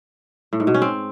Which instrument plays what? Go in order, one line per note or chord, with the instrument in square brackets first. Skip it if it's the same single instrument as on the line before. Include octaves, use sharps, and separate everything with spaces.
[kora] A2
G#2
B2
C#4
C4